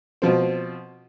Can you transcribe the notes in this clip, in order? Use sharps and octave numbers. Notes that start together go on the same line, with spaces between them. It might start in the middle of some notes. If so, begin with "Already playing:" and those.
B2 F3 C4